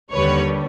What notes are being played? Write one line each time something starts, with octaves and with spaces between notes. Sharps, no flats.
D#2 D3 G3 B4 C#5